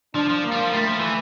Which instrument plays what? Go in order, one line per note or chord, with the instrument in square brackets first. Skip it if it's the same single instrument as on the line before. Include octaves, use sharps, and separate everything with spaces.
[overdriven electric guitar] F3 [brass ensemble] D4
[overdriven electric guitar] F3
[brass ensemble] A#3
[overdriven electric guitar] G3
F3
[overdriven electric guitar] G3 [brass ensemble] A3
[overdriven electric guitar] F3
E3